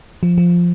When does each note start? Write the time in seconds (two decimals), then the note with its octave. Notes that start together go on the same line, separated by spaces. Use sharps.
0.23 F3
0.38 F3